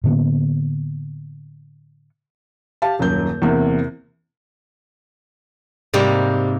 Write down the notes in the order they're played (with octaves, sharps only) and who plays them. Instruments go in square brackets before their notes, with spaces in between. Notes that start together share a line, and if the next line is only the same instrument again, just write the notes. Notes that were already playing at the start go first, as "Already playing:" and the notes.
[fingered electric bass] A2 D3 A#3 B3
[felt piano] G4 F5 A5
D#1 F#2 G6
E2 C3 A#3
[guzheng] G#2 C3 A#3 [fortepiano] G3